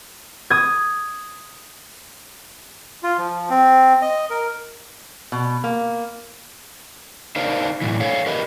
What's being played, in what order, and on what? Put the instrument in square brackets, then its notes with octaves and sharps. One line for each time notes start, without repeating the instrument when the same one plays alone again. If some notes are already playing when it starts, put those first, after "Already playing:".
[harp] D#6 G#6
[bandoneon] F4
F3
C4
D#5
A#4
[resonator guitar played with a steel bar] B2
A#3
[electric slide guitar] D4 D#4 A#4 C5 F5
F#2 A2 E3
A4 C#5 F5
G4 A#4 B4 D#5